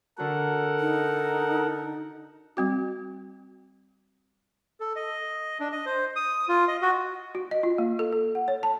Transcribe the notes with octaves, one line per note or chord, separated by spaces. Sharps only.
D3 F#4 A4 A#4 F#5
D#4
G3 C4 F#4
A4
D#5
D4
D#5
C5
D#6
F4
D#5
F#4
F#4
D#5
F4
A#3
A4
A4
F#5
C#5
A5